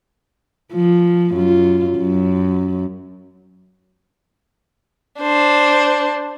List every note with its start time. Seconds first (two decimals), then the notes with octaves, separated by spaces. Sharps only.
0.73 F3
1.34 F#2 F4
1.98 F#2
5.21 D4 C5